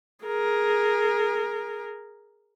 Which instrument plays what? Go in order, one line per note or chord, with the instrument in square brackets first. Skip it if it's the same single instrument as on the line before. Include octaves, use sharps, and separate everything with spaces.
[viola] G#4 A#4